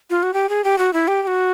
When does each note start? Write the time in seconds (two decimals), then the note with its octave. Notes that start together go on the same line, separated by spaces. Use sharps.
0.10 F4
0.23 F#4
0.34 G4
0.49 G#4
0.64 G4
0.78 F#4
0.93 E4
1.08 G4
1.23 G4
1.27 F#4